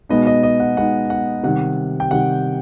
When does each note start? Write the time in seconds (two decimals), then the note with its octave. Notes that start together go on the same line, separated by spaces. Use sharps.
0.09 B2 G#3 B3 D#4 D#5
0.27 D#5
0.43 D#5
0.60 F#5
0.77 B2 G#3 B3 D#4 F#5
1.10 F#5
1.43 C3 D#3 G3 F#5
2.00 G5
2.11 C3 D#3 G3 F#5